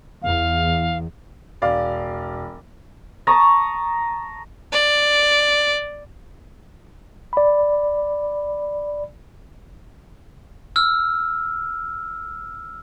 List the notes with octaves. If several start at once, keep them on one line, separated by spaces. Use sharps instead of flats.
E2 F5
E1 D5 F5
A5 A#5 C#6 D#6
D5
D5 B5
E6 F6